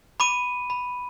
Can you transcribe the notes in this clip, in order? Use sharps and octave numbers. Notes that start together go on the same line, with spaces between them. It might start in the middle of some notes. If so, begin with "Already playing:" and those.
B5 D6 D#7
B5